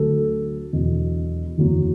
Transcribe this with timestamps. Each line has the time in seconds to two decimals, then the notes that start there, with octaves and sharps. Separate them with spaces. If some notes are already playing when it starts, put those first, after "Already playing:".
Already playing: D2 D3 F#3 A4
0.73 E1 E2 B2 F#3
1.58 F#1 E2 C#3 F#3